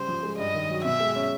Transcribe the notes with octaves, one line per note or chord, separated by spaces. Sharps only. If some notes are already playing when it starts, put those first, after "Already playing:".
Already playing: C#3 G3 C5
F3
G#3
G2 D#5
D#3
F#3
B2 E5
G#3
C#4